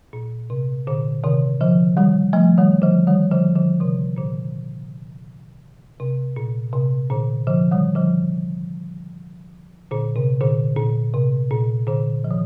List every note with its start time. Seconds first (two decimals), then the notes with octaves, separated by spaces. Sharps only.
0.13 A#2
0.50 C3
0.87 A#2 D3
1.24 C3 D#3
1.61 D3 F3
1.97 D#3 G3
2.33 F3 A3
2.58 D#3 G3
2.82 D3 F3
3.07 D#3 G3
3.31 D3 F3
3.55 D3 F3
3.81 C3 D#3
4.17 A#2 D3
6.00 C3
6.36 A#2
6.73 C3
7.10 A#2 D3
7.47 D3 F3
7.71 D#3 G3
7.95 D3 F3
9.91 A#2 D3
10.16 C3
10.41 A#2 D3
10.77 A#2
11.14 C3
11.51 A#2
11.87 A#2 D3
12.24 F3
12.31 D#3